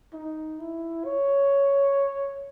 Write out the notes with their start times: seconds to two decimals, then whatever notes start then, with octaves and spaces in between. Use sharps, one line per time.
0.13 D#4
0.59 E4
1.05 C#5